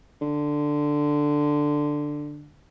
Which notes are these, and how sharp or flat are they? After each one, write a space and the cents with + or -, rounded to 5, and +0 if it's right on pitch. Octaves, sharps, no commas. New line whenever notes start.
D3 +5